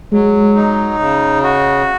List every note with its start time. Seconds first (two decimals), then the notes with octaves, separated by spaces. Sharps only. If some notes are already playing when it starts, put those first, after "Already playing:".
0.12 F#3 G#3
0.55 D#4
0.99 C#3
1.43 F#4